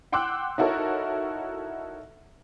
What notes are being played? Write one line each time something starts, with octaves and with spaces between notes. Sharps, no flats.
F#5 G5 C6 D6 E6 F#6
D#4 E4 F#4 A4 A#4 C#5